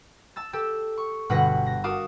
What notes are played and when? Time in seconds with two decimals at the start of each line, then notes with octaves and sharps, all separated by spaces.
0.36 A5 E6 A6
0.53 G4 A4 E6
0.98 C#6
1.29 G1 B2 B4 F#5 A#6
1.66 A#6
1.84 F#4 A#4 F5 A5 D6 D#6